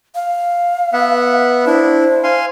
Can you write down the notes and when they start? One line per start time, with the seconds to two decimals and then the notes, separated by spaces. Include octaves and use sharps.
0.15 F5
0.93 B3 E5 F#5
1.67 D4 E4 C5
2.24 F5 G#5 C6